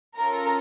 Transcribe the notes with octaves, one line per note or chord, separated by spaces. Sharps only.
C#4 F4 A4 A#4 A#5